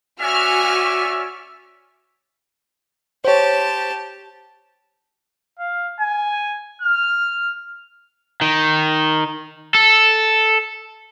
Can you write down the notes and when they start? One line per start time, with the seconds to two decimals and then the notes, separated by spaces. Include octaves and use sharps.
0.21 C#4 F#4 D5 E5 G#5 F6
3.25 G4 C5 C#5 A5
5.59 F5
6.00 G#5
6.82 F6
8.41 D#3
9.75 A4